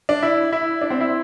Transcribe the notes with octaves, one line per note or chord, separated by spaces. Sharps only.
D4
E4
E4
D4
C4
E4